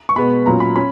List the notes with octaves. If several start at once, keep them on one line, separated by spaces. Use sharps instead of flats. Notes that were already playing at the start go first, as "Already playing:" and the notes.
C#6
B2 G#3 B3 B5
A#2 F#3 C#4 A#5
B5
C#4 B5